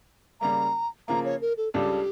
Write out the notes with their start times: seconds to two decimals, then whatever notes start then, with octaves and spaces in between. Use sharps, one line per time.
0.41 C#3 G3 A#3 A#5
1.08 C#3 F3 A#3 A#5
1.25 C#5
1.42 A#4
1.57 A4
1.74 C#2 C#3 G3 D4 G4 A4